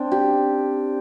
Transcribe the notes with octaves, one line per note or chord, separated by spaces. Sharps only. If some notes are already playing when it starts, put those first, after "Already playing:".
Already playing: C4 D4
G4